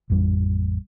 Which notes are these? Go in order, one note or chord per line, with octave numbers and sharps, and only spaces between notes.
A1 F2 G3